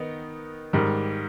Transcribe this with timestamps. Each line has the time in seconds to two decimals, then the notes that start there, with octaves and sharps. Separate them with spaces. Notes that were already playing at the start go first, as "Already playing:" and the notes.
Already playing: D#3 B3 D#4
0.73 G#2 D#3 G3